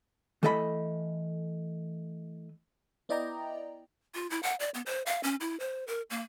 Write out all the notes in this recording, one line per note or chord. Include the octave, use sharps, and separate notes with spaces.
E3 A3 A4 D#5 F#5 B5
B3 E4 D5 D#5 G5 A#5
F4
E4
F#5
D5
B3
C5
F5
C#4
E4
C5
A#4
A#3